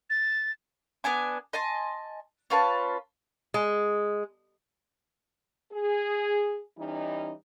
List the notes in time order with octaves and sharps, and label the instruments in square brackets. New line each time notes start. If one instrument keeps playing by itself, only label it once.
[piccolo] A6
[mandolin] B3 D4 G#5 D6
D#5 G#5 A5 C6
C#4 F4 B4 A5
[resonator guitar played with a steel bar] G#3
[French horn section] G#4
E3 G3 C#4 D#4